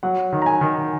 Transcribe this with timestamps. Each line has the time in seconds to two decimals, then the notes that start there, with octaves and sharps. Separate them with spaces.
0.03 F#3 F#5
0.32 D#3
0.42 A#5
0.46 G#5
0.61 D#3